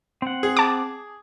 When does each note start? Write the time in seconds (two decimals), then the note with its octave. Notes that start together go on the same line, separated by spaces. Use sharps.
0.22 C4 F#5
0.43 G#4
0.57 A5 D6